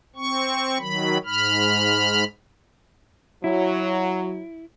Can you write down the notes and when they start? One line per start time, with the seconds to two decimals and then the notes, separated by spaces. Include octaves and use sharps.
0.16 C4 C#6
0.79 D#3 F#3 B5
1.25 G#2 B5 F6
3.44 F#3 E4